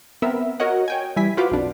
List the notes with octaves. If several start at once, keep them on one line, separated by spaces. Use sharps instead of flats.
B3 C4 A#4 E5
F#4 A#4 C#5 D#5 F#5
C#5 G5 G#5
E3 G3 E4 G#5 B6
F4 F#4 B4 C5 F5 D6
B1 F2 D4